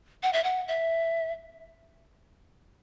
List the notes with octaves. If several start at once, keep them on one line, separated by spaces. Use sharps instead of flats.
F#5
E5
F#5
E5